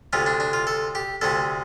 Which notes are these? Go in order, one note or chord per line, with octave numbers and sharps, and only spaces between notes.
D2 C3 A3 F4
D4
D4
F4
A4
G4
D2 C3 A3 A4